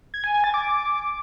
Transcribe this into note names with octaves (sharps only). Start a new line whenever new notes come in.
G#6
G#5
G#5
A6
D6